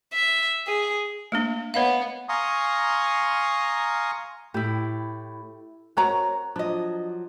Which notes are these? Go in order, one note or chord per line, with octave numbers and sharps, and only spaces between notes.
E5
G#4
A3 A#3 D4
B3 C#5 D#5 F5
F5 G#5 A#5 C6 C#6 D#6
A2 E4 G4
C4 F#4 A#4 C#5 A#5
F3 F#3 D4 D#5